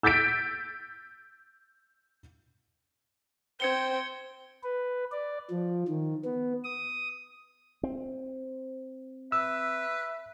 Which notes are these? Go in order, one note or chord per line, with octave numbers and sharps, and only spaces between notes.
E6 G6 A6 B6 D7
C4 C5 G5 G#6 C#7 G7
B4
D5
F3
D#3
B3
D#6
C4
B4 E5 E6